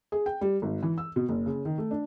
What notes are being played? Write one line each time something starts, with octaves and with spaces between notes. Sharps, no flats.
G#4
G5
G3
G#1
E3
E6
B2
F#1
C#3
D#3
A3
D4